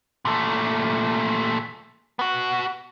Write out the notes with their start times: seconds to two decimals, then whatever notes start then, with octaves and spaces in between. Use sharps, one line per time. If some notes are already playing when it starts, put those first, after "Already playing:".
0.25 A#2 A3
2.19 B3 F#4